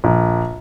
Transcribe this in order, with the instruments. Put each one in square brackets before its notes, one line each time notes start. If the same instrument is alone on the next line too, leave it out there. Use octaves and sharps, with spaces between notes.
[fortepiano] A#1